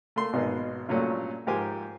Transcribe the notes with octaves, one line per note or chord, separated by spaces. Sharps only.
A3 A#3 C6
G#1 B2 A#3 B3 D#4
G2 A#2 F#3 A3 C#4
G#2 F3 G4 A#4 C5 G#5